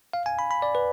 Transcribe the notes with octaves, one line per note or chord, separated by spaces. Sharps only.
F5
G#5
B5
B5
D5
B4